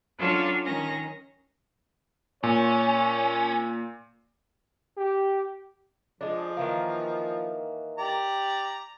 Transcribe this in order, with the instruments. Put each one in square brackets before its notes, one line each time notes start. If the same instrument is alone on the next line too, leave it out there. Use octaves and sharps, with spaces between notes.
[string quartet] F#3 C#4 D4 F4 A4 C#5
D#3 C#4 A#6
[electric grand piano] A#2 [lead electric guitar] C#4 [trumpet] C#5
[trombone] G4
[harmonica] F3 [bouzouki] G#3 D4
[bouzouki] D#3 E3 A#3
[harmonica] G4 D5 A#5